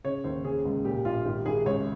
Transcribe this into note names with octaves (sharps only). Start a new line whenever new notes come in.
C#3 C#5
D#2 C5
C#3 G#4
C#2
A#2 G4
A#1 F4
G#1 G4
G#1 G#4
C#2 C#5